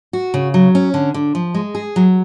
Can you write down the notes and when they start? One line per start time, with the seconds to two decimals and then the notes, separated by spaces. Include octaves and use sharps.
0.13 F#4
0.34 C#3
0.54 F#3
0.75 C#4
0.94 D3
1.14 D3
1.35 F3
1.55 G#3
1.75 G#4
1.96 F#3